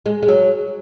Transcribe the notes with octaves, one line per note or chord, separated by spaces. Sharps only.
G#3
G#3
F#3